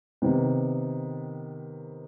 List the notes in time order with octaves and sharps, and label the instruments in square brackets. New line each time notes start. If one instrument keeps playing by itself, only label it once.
[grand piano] C3 D#3 B3